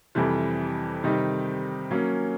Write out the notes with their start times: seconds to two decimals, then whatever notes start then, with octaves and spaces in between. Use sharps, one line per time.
0.15 F2 C3 E3 G3
1.04 C3 D#3 G3 C4 D#4
1.91 F#3 A#3 C#4